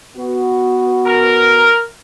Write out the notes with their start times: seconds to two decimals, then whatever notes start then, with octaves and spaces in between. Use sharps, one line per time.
0.17 B3 F#4
1.06 A#4